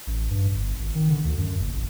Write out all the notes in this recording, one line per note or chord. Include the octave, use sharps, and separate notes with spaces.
A1
G2
G1
G#1
D#3
D3
D2
F#2
F#1
A1